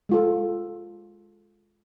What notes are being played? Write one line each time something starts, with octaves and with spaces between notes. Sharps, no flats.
G#3 F4 A4